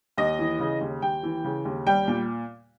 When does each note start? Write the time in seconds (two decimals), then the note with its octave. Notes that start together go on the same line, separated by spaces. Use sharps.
0.18 D#2 D#5
0.39 E3
0.60 C#3
0.81 D#2
1.02 D#2 G5
1.23 E3
1.44 C#3
1.65 D#2
1.86 G3 G5
2.08 A#2